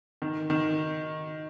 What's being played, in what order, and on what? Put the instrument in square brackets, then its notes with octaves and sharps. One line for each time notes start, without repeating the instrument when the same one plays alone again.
[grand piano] D#3
D#3